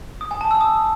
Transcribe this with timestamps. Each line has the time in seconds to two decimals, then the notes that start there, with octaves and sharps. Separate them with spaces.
0.21 D#6
0.31 G#5
0.41 A5
0.51 E6
0.61 D#6